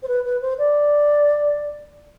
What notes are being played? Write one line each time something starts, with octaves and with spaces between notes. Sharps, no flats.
C5
B4
B4
C5
D5